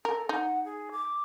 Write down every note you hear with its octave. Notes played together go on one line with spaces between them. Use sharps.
A4 A#4
D#4 F#5
G#4
D6